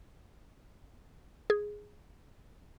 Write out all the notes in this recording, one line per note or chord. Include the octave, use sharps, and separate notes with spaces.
G#4